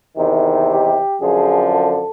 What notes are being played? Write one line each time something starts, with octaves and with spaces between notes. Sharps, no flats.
E2 C3 D#3
G4
F#2 D3 F3 G#4
A4